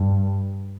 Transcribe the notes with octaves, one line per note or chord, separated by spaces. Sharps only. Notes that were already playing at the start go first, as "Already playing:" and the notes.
Already playing: G2